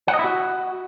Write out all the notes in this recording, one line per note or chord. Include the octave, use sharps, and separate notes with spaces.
F#5
D#5
E4
F#4